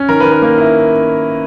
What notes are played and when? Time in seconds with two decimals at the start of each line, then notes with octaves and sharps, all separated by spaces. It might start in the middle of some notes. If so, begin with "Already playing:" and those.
Already playing: C#4
0.08 D#3 A#4
0.20 D#3 B4
0.31 A#4
0.42 A#3
0.58 E4